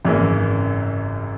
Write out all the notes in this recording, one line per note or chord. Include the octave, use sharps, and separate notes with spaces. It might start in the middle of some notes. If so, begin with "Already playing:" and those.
G#1 F#2 C#3 E3 A#3